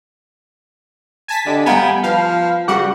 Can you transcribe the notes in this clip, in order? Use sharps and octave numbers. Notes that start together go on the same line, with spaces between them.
G#5 A5 B6
D3 G4 D5 D#5
G3 B3 F5 G5 G#5 A#5
F3 B4 F5 A5
C#3 G3 F#4 F#5 D6